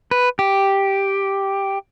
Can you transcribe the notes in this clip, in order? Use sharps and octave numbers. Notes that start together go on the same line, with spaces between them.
B4
G4